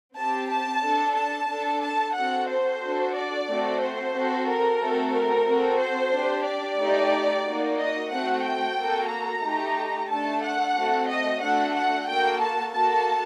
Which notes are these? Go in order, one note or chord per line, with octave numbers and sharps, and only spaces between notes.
C4 G4 A5
A5
D4 A4
A5
D4 A4
A5
C4 F#4 A4 F#5
C5
D4 F#4 A4
D5
A3 C4 F#4 A4
C5
C4 F#4 A4
A#4
A3 C4 F#4 A4
A#4
C4 F#4 A4
C5
D4 G4
D5
A3 D#4 G4
A#3 D#4 F#4
D#5
A3 C4 F#4 F#5
G5
A#3 F#4 A4
A#5
A3 D#4 G4
A3 D4 A4 A5
F#5
A3 C4 F#4 A4
D#5
A3 D4 F#4 A4 F#5
F#5
A#3 F#4 A4 G5
A5
A#3 F#4 A4 A5